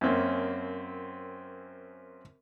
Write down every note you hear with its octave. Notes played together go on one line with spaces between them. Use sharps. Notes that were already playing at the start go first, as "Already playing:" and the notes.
F#2 A#3 C4 C#4